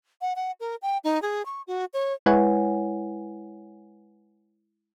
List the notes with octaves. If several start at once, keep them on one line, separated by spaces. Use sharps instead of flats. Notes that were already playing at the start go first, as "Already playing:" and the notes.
F#5
F#5
A#4
G5
D#4
G#4
C#6
F#4
C#5
G#3 E4 B4 C#5 F#5 G#5